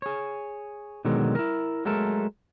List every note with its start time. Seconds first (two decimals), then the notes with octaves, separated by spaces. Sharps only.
0.02 G#4 C#5
1.05 B2 D3 D#3 F#3 G#3
1.35 E4 A#4
1.85 F#3 G#3 A3 A4 A#4